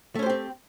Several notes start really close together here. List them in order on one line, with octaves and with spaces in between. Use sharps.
A3 C#4 C5 G4 C4